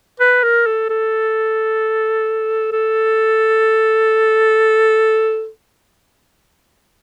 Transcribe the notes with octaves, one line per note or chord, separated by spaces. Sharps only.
B4
A#4
A4
A4
A4